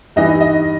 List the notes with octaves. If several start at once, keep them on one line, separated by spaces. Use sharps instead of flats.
G2 E3 G3 D#4 D#5
D#4 D#5